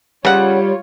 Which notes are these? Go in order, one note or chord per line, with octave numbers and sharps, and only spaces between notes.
C#3 G3 F4 C#5 F#5